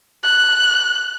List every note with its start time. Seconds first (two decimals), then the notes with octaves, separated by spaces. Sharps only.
0.23 F#6